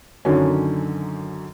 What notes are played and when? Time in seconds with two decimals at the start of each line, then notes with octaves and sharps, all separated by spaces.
0.25 F#2 D3 D#3 F#3 C#4